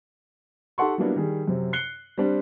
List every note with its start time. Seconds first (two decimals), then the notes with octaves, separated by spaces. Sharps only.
0.78 D#4 G4 A4 F#5 C6 C#6
0.98 F#3 G3 A#3 B3 D4 E4
1.16 D#3 G3 G#4
1.47 F#2 C3
1.73 F#6 C7 C#7 G7
2.18 G3 C4 D4